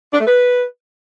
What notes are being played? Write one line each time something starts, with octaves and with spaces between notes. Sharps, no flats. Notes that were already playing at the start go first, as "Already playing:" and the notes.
D4
A3
B4